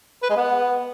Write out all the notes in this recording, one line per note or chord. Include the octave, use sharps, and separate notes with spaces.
B4
G#3
B3